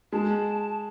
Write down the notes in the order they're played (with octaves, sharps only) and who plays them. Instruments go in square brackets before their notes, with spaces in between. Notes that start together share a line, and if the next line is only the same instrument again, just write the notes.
[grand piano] G#3 [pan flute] A5